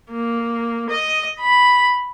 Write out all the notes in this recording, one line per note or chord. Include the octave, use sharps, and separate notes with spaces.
A#3
D#5
B5